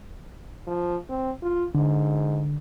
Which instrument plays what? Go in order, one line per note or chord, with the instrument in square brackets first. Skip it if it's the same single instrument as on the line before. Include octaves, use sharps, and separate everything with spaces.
[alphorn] F3
C4
F4
[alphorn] G#2 [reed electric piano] D3